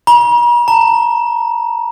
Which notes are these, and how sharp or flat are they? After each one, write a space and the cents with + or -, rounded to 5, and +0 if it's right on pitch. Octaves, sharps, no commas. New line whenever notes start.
A#5 +45
A#5 -40